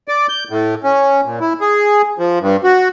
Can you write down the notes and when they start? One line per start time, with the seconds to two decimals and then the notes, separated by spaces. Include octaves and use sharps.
0.08 D5
0.29 G6
0.50 A2
0.84 C#4
1.25 A#2
1.40 E4
1.61 G#4
2.18 F3
2.40 G2
2.64 F#4